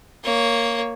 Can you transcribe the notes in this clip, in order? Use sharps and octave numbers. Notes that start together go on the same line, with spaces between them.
A#3 C#5